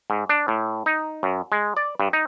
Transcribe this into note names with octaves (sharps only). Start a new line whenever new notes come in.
G#2
D4
A2
D#4
F#2
G#3
D5
G2
D#4